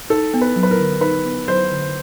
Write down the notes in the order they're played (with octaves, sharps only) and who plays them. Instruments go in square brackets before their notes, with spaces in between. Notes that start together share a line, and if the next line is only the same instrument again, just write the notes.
[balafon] D#4 [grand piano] A4
[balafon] B3
[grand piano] B4
[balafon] F#3
[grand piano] B4
A#4
[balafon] D3
[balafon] D#4 [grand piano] B4
[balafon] B3
[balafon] F#3 [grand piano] C5
[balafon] D3